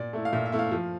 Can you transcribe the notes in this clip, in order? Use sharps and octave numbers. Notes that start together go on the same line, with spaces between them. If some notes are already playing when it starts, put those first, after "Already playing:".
Already playing: A#2 D5
A3 E4
F5
A#2 E5
E5
A3 E4
F5
F3